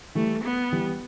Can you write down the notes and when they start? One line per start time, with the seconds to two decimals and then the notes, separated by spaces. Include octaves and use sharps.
0.15 E3 G3 A3
0.44 B3
0.72 E3 G3